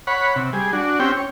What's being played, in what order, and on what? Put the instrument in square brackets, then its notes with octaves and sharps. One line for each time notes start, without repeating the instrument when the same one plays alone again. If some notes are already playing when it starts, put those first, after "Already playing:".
[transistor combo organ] C#5 F#5 B5
C3
G3 G#4
D4 F#4
C4 C#4 G4 G5
C#5